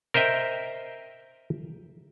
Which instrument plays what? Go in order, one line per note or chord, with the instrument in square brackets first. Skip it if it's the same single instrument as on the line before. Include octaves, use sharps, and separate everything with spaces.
[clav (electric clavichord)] A#4 C5 D#5 E5 G5